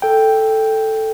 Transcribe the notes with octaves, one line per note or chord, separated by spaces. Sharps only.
A4 G5